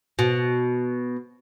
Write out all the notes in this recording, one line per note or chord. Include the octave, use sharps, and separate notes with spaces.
B2